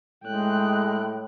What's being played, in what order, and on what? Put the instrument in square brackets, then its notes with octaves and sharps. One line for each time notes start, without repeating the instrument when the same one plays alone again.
[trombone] A2 [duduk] G#3 [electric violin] G5 F#6